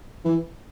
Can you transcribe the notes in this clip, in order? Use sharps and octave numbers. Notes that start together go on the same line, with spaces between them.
E3